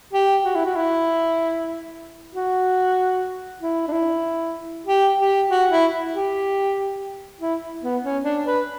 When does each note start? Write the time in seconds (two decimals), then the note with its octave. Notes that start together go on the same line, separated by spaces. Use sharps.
0.13 G4
0.45 F#4
0.55 E4
0.65 F#4
0.76 E4
2.35 F#4
3.61 E4
3.88 D4
3.92 E4
4.87 G4
5.19 G4
5.50 F#4
5.71 E4
6.13 G4
7.40 E4
7.83 B3
8.04 C#4
8.24 D4
8.46 B4